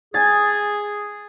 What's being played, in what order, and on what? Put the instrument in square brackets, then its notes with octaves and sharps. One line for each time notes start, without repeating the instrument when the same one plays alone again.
[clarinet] G#4 [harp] G#5 A6